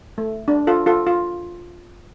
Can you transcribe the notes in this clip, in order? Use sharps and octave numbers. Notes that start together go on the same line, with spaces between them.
A3
D4
F4 A4
F4 A4
F4